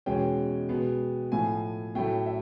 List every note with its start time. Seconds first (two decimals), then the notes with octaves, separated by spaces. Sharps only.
0.06 E2 B2 G#3 C#4 G5
0.69 B2 G#3 B3
1.32 A2 F3 A3 G#5
1.95 A2 F#3 A3 G5
2.26 E5